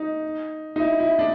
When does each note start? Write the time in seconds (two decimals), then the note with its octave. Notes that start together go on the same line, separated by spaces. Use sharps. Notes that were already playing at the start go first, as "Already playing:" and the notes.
Already playing: D#4
0.76 D#4
0.80 E4
1.00 E4
1.19 D4